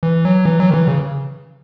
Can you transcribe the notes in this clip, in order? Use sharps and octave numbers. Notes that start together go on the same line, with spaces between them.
E3
F#3
E3
F#3
D#3
E3
C#3